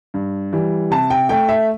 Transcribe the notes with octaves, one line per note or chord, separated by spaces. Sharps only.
G2
E3 G3
C3 A5
G5
A3 G5
E5